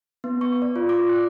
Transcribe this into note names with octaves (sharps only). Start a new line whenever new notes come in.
B3
C#6
D5
F4
D6
F#6